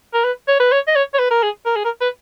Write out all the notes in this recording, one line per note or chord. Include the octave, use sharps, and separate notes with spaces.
A#4
B4
C#5
B4
C#5
D#5
C#5
C#5
B4
A#4
G#4
A#4
G#4
A#4
B4